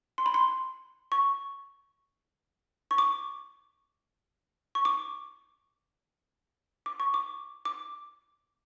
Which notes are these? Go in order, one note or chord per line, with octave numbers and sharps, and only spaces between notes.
C6
B5
C6
C#6
C#6
D6
C#6
D6
D6
C#6
D6
D6